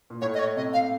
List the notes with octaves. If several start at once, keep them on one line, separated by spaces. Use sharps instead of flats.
A#2
A2 C#5
D#5
C#5
C3 D#5
F5